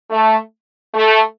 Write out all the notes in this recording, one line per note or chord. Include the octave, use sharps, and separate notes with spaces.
A3
A3